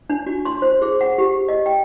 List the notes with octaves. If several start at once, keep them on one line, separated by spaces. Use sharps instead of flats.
D4
F#4
C6
C5
G#4
F#5
G4
D#5
G5